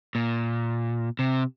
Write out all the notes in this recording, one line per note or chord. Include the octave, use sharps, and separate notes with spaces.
A#2
C3